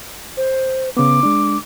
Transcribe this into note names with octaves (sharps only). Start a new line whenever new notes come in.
C5
C#3 B3 D6
G#3 D4